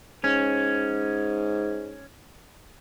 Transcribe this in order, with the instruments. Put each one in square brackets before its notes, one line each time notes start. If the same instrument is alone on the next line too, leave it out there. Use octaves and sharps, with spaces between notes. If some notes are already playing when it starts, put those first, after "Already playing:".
[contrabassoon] G#2 [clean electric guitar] C#4